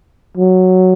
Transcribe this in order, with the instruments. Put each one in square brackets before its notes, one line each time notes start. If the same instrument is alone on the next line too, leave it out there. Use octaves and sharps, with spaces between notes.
[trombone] F#3